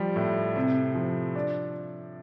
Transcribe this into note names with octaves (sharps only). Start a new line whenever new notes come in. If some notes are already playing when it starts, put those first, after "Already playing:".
Already playing: F3 G3
A2
C3
F3
D4